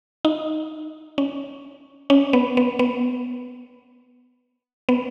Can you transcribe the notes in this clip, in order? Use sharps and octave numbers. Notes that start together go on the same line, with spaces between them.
D#4
C#4
C#4
B3
B3
B3
B3